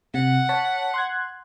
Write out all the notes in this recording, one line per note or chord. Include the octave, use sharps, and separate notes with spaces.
C3 F#5
C#5 A5 B6
C6 F#6 G#6